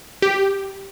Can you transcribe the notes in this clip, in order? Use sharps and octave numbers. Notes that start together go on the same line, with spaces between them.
G4